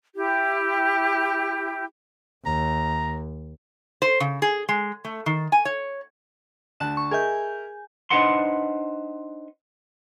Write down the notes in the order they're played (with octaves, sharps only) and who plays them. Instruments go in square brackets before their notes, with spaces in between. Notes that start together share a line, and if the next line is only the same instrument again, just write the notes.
[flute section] E4 G4
[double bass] D#2 [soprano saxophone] A#5
[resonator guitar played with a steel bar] C5
C#3
G#4
G#3
A3
D#3
G#5
C#5
[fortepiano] D2 A5 F#6 [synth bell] E7
[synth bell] C#6
[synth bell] G#4 G#5 G6 [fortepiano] A#4 D#5 E5
[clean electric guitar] D4 D#4 B4 C5 F#5 C6